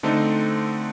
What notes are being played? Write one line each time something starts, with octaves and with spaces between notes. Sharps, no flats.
D3 A3 C4 D#4